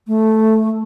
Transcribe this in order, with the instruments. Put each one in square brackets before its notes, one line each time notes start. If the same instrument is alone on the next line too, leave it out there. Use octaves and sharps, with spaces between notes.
[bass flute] A3